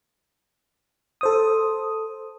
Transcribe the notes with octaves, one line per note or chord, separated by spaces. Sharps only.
A4 C5 D#6